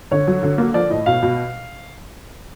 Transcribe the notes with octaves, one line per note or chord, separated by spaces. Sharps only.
D3 C#5
F#3
D3
A#3
F3 D5
A2 D#5
B2 F5
B2